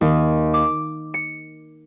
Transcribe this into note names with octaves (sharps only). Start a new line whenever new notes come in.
D#2
D6
C#7